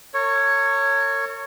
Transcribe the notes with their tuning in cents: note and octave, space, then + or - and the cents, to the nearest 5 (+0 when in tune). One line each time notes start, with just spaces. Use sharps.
A#4 -45 C#5 +0